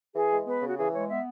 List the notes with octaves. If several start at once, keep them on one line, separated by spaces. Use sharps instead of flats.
E3 G#4
G#3
B3 B4
C#3
F#4
E3 G#4
G#3 C#5
B3 E5